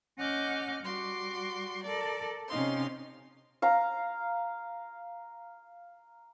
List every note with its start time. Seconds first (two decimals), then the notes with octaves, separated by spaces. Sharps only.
0.17 C#4 D#5 F#5 D6 F6 G6
0.81 G3 F#4 C6 D6
1.83 A4 A#4 D5
2.49 C3 C#4 D#4 F5 C6
3.62 F5 A#5